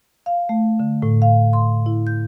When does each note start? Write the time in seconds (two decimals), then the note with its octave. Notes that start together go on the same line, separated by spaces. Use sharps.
0.26 F5
0.49 A3
0.80 D3
1.02 A2
1.22 F5
1.53 C6
1.86 E4
2.07 G6